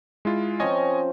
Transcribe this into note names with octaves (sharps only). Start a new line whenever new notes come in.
G#3 E4 F4
F3 C4 C#4 C#5 D#5 G#5